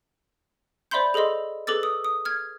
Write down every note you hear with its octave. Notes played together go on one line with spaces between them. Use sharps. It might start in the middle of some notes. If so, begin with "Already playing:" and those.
C5 D5 E5 B5 C6 G6
G#4 A4 C5 D#5 C6
G#4 A4 B4 D6 E6 A6
D#6
D#6
F6 G#6